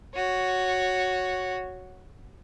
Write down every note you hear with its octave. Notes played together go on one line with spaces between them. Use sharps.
F#4 C#5